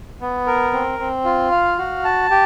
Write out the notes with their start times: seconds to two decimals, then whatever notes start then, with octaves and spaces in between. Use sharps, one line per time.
0.21 B3
0.47 A#4
0.73 C4
0.99 C4
1.25 F4
1.51 F5
1.78 F#4
2.05 A5
2.31 G4